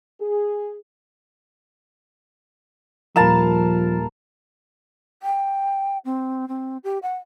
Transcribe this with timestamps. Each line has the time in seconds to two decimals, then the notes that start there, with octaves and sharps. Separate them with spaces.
0.21 G#4
3.16 D#1 F3 A#4 F5 A5 B5 E7
5.23 G5
6.05 C4
6.48 C4
6.84 G4
7.03 F#5